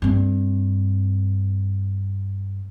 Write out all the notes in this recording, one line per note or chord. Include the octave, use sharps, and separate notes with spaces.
G2 C4